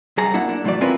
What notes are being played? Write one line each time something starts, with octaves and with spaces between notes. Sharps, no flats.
F#2 G3 G#4 A5 A#5
F#2 A#3 D4 E4 F#5
D4
A2 D3 E3 F#3 D5
C4 C#4 E4 F4 A#4 B4